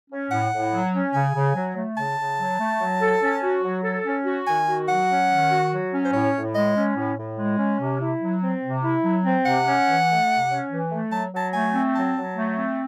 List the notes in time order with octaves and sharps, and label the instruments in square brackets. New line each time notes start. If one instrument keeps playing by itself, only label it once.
[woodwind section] C#4
[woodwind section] A2 [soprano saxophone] F#5
[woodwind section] A2
F#3
C#4
[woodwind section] C#3 [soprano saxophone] G#5
[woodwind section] C#3
F#3
A3
[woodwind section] C#3 [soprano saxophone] A5
[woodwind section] C#3
F#3
A3
F#3
A4
C#4
F#4
F#3
A4
C#4
F#4
[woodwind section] D#3 [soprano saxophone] G#5
[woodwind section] F#4
[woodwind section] F#3 [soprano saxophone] F#5
[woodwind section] C#4
D#3
F#4
F#3
C#4
[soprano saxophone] C5
[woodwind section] A2 [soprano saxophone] C#5
[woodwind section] A2
[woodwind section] G#3 [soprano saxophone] D#5
[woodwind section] C#4
A2
A2
G#3
C#4
C3
E4
F#3
C4
C3
E4
F#3
C4
[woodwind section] C3 [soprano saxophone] F#5
[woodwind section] C#4
E3
A3
C3
C#4
E3
A3
[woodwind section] F#3 [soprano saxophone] A5
[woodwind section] F#3 [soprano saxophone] A5
[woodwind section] A3 [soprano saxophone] G#5
[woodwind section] C4
[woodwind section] F#3 [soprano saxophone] A5
[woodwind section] F#3
A3
C4